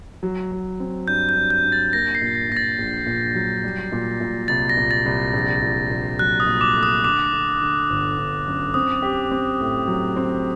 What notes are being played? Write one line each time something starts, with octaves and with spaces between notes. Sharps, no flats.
F#3
F#3
C4
G2 G6
G6
G2
G6
G2
A6
A#3 A#6
C7
A#2
A#6
A#2 A#6
A6
A#1
A#2
F#3
G3
A#2
A#2
C2 A6
A#6
A#2
A6
C2
A#1
A#2
A#1
F#3 F#6
D#6
A#2
D6
A3
D#6
D3 D6
D3
D3
G1
G1
F#2
C4 D#6
G4
C4
A2
F#3
C4